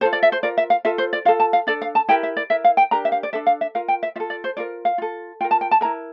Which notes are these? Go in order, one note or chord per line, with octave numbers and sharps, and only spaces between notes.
F4 A4 C5
D5
E5
C5
F4 A#4 D5
E5
F5
F4 A4 E5
C5
D5
F4 A4 F5
A5
F5
D4 A4 D5
F5
A5
E4 G4 A#4 G5
E5
D5
E4 A#4 E5
F5
G5
D4 G4 A#4 A#5
E5
F5
D5
D4 A4 E5
F5
E5
F4 A#4 F5
G5
E5
F4 A4 E5
D5
C5
F4 A#4 D5
F5
F4 A4
F4 A#4 G5
A5
G5
A5
E4 A#4 A#5